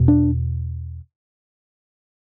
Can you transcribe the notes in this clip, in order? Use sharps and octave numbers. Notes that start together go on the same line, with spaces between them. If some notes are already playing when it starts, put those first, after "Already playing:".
Already playing: E2 B2
D4